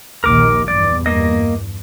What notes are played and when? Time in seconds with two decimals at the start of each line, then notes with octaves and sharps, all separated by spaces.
0.24 A#1 D#2 D#3 A#4 D6
0.68 E2 G2 D5
1.06 A#3 D#5